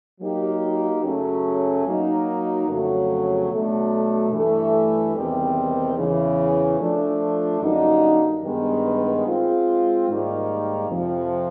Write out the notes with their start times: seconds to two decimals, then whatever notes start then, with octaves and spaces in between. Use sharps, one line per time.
0.21 F#3 A#3 D#4 G4
1.03 F#2 C#3 F#3 A3 C#4
1.86 F#3 A#3 D#4
2.68 F2 C#3 F#3 A3
3.50 B2 F#3 A3 D4
4.32 G2 E3 A3
5.14 E2 C3 D#3 G3 C4
5.97 E2 C#3 E3
6.79 F3 A3 D4
7.61 F#2 D3 G3 A#3 D#4
8.44 G2 D#3 G#3 B3
9.26 G#3 C4 F4
10.09 G#2 D#3 G3 A#3 D#4
10.90 F2 C3 F3